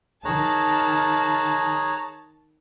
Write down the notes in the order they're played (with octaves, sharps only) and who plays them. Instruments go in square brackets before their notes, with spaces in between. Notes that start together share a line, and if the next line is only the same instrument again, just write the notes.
[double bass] D#3 [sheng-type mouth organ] G#4 F#6 [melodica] C#5 A#5 [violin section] A5